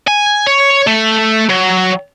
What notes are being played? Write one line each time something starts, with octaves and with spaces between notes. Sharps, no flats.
G#5
C#5
A3
F#3